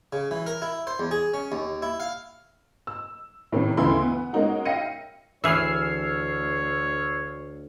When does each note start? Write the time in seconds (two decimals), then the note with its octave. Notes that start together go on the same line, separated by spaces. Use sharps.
0.13 C#3
0.31 E3
0.46 A#4
0.62 E4
0.87 C5
0.99 E2
1.11 G#4
1.34 C#4
1.52 D#2
1.82 E4
2.00 F5
2.87 E6
3.52 A2 C3 D#3 C#4
3.77 D2 C#3 E3 A3 E4 C6
4.02 B3
4.33 G#3 A#3 C#4 D#4 F#4
4.65 E5 F5 G5 A#6 C#7 D#7
5.44 D2 E3 G#4 C#5 E6 F6 C7